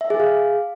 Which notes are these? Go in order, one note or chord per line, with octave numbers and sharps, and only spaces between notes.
E5
G#4
F5